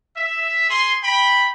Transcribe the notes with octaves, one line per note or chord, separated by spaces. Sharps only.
E5
G#4 C6
G5 B5